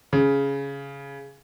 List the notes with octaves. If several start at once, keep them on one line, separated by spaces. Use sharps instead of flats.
C#3